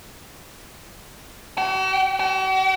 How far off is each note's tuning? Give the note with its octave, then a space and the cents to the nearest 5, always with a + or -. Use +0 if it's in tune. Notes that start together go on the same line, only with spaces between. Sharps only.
F#4 +45
F#4 +45